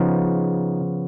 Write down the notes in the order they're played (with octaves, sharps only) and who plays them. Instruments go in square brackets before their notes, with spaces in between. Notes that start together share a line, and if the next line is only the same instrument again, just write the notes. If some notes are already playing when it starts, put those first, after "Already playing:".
Already playing: [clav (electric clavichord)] C#3 F3 B3 D#4